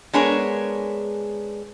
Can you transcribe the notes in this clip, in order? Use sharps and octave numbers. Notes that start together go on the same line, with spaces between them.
G#3 B3 D4 G#4 A#4 C#5